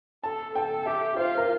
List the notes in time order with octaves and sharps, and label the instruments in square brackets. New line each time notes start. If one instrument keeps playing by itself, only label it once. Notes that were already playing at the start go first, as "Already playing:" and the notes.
[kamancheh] A4 [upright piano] A5
[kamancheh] A4 [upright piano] G5
[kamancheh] G4 [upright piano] E5
[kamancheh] F4 [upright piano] C5
[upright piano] A#4